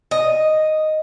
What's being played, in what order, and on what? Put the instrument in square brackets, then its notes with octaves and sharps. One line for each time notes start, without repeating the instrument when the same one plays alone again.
[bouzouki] D#5